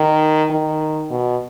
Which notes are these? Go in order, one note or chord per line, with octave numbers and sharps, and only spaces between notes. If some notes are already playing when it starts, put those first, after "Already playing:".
Already playing: D#3
D#3
B2